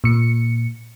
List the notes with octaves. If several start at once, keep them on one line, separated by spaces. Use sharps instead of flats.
A#2 C#7